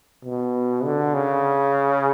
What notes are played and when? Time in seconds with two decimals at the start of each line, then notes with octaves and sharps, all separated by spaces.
0.25 B2
0.85 D3
1.14 C#3